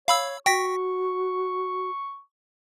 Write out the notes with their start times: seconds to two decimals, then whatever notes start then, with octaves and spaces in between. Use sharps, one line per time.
0.08 C#5 F5 B5 E6
0.46 F#4 G5 C#6 A#6 B6